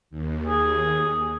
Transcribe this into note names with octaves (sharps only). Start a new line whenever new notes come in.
D#2
G#4